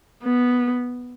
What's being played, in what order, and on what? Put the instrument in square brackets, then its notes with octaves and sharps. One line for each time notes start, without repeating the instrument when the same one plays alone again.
[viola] B3